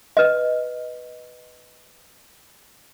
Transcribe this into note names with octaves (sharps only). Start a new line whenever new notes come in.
B4 D#5